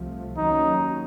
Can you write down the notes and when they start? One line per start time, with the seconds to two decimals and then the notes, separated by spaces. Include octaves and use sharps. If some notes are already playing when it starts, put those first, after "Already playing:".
Already playing: C2 C3 F3 A3
0.37 D#2 D#3 F#3 A#3 C#4 D#4